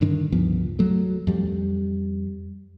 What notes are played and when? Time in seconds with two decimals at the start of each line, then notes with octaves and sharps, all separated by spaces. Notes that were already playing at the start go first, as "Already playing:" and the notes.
0.01 G2 D3 D#3
0.32 C#2 G2 F3 B3
0.79 F#3 A3
1.27 F2 G3